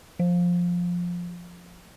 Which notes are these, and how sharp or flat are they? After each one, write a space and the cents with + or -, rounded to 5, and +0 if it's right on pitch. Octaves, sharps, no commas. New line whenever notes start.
F3 +10